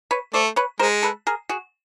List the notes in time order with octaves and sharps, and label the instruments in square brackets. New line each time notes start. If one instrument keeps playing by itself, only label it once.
[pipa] B4 C#5
[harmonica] A3 [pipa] C5 D5
[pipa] B4 C#5
[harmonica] G#3 [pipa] A#4 C5
[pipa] A4 B4
G#4 A#4
F#4 G#4